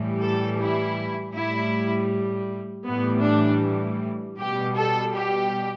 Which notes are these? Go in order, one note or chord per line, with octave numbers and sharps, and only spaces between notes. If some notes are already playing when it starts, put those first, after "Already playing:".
Already playing: A2 E3 G3
A4
E4
A2 G3 E4
A2 E3 G3 B3
D4
B2 G3 G4
A4
G4